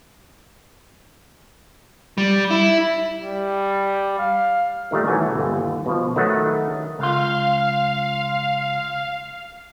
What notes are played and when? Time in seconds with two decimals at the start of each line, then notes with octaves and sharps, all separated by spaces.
2.18 G3
2.51 E4
3.21 G3
4.19 F5
4.91 A#2 D#3 G3 A3
5.07 B1 E3 A3 F#4 G#5 A#5
5.35 G1 D#2
5.86 B2 F3
6.16 D#3 F#3 A3 B4 D#5 F#5
6.99 C#2 F4 F5